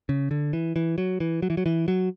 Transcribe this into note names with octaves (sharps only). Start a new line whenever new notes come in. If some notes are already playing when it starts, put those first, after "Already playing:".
C#3
D3
E3
E3
F#3
E3
F#3
E3
F#3
E3
F#3